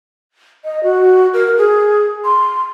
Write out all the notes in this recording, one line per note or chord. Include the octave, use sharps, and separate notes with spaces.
D#5
F#4
A#4
G#4
C6